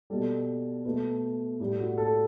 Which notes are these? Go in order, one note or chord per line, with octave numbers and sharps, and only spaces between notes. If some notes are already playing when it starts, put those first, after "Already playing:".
B2 G3 A4
B2 A3 B4
A2 G3 G4
F#4
A4